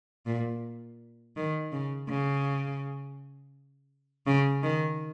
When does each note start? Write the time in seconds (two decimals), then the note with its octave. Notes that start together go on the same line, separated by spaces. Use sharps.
0.26 A#2
1.36 D#3
1.72 C#3
2.09 C#3
4.27 C#3
4.63 D#3